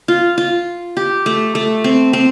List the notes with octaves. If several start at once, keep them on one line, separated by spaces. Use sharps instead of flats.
F4
F4
G4
A3
A3
C4
C4